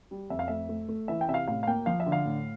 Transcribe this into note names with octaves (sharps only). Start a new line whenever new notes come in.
G3
F2 E5
F5
A3 E5
A3
A3
E3 E5
G5
C3 E5
F5
A2 F5
F5
A#3 G5
F3 F5
E5
D3
F5
A2